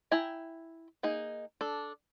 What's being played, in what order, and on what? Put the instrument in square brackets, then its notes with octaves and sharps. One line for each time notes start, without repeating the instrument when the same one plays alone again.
[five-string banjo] E4 G5 G#5 A#5
A#3 D#4 G#4
D4 A4